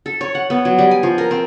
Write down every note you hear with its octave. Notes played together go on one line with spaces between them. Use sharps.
A4
C#5
F#5
B3
F#3
G3
G#5
F3
A#4
C4